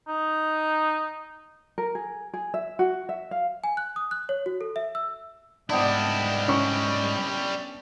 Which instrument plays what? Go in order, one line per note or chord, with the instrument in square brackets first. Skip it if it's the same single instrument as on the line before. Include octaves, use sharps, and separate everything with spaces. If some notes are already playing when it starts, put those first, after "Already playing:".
[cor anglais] D#4
[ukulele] A#4
G#4
G#4
E5
F#4
E5
F5
[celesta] G#5
F#6
D#6
F#6
C#5
F#4
A4
E5
E6
[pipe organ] G#2 D#5 G5 [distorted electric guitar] G3 E4 [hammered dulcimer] B3 D4
[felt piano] C#4 C#6